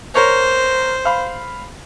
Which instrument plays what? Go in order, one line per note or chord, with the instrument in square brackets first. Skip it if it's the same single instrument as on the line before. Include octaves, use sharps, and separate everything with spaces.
[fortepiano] A#4 C#5 [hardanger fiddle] C5
[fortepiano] F5 B5